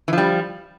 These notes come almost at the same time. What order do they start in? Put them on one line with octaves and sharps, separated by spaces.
E3 F3 G3